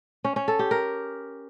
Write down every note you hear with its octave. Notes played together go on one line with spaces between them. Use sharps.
C#4
C#4
A4
G4
A#4